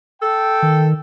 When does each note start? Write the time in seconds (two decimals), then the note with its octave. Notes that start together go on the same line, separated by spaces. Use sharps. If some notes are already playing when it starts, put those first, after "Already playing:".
0.22 A4 G5
0.62 D#3